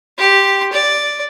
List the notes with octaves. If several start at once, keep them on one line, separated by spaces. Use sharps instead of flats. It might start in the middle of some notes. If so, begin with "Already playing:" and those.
G4 C6
D5